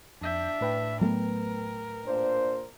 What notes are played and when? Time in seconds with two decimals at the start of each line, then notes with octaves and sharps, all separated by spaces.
0.22 F2 D4 E5 G6
0.61 A2 B4 G5
1.01 F#3 A3 B3 A#4
2.06 A#2 D4 C5